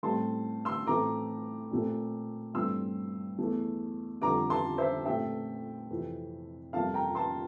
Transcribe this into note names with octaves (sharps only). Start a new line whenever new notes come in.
A2 G3 C4 A5 C6
C6 E6
A2 E3 A3 C4 A#5 D6
A#2 A3 C4
G2 E3 A3 C4 C6 E6
E2 E3 A3
F2 D3 G3 A#5 D6
A5 C6
C5 E5
A#2 A3 C4 E5 G5
F2 C3 E3
F2 C3 G3 A#3 F5 A5
G5 A#5
A5 C6